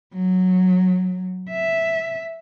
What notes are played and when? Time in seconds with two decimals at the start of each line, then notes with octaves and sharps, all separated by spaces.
0.14 F#3
1.50 E5